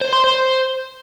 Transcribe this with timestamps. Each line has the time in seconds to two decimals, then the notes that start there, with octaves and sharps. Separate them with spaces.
0.01 C5
0.13 C6
0.24 C5